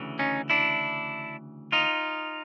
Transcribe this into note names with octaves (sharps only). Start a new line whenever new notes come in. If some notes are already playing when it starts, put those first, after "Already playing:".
Already playing: D2 C#3 E3
C#4 D#4
D4 E4
D#4 F4